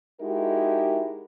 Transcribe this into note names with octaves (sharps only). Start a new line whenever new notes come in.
G#3 D#4 E4 F#4 G4 A#4